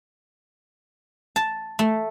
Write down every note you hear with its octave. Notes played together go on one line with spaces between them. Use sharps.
A5
A3